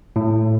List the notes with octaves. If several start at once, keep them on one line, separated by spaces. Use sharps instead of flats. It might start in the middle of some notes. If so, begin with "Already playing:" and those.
A2